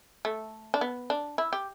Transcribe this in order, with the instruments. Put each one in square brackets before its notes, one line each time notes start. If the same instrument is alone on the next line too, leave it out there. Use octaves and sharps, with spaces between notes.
[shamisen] A3
D4
B3
D4
E4
G4